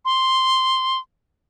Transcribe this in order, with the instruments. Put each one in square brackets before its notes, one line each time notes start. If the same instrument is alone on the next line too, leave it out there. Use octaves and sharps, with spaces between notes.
[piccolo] C6